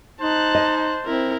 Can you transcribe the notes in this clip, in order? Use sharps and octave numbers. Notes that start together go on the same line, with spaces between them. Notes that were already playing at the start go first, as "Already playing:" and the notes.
D#4 C5 A5 F#6
D#5
C4 E4 A#4